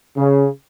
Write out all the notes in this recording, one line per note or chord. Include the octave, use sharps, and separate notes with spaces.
C#3